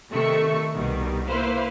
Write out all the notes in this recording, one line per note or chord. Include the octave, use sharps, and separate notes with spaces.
C3 D#3 A3 E5 C#6 C#7
C2 B2 D#3 G3
A#3 E4 B4 C5 F5